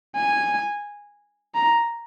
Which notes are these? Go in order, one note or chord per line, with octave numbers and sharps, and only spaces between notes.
G#5
A#5